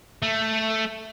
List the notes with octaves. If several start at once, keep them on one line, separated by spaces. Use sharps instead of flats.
A3